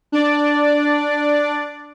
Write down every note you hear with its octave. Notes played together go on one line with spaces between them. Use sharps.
D4 D5